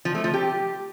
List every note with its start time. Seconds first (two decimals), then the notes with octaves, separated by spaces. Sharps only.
0.05 F3
0.15 A3
0.24 F3
0.34 G4